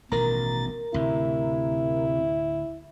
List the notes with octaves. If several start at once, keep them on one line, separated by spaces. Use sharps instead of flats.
A1 B2 D#3 A#4 A#5 A6
D2 A2 C3 E4